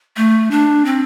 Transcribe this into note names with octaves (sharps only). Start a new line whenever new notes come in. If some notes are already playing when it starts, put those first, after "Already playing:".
A3
D4
C4